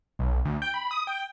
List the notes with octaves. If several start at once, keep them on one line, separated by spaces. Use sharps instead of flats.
B1
D2
G5
B5
D#6
G5